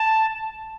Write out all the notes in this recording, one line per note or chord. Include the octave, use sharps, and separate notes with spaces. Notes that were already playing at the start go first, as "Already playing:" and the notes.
Already playing: A5